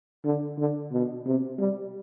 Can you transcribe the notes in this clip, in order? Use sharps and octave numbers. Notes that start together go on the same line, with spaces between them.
D3
D3
B2
C3
G3